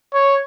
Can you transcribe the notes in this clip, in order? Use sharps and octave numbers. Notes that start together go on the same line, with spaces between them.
C#5